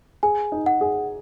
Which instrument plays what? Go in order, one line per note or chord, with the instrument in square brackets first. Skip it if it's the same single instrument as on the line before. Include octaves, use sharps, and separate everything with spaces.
[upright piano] G#4 [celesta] G#5
[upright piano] D#4
[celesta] F#5
[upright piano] G#4